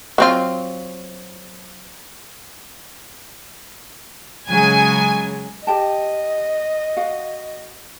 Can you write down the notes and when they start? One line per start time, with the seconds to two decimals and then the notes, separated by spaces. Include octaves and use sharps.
0.18 F#3 C4 F4
4.49 C#3 F#3 G#3 G#5
5.67 G4 D#5 G5 A5
6.97 F#4 F5 F#5